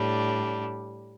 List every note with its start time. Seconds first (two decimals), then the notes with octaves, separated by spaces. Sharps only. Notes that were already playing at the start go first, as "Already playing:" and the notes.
Already playing: A2 G3 D4